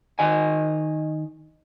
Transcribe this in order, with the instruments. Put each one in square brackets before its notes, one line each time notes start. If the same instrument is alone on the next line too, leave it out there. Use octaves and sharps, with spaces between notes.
[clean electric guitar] D#3 D#5 G#5